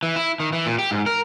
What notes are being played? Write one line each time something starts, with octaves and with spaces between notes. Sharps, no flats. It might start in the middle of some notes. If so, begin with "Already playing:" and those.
E3
E4
D#3
E3
A#2
G4
G#2
A#4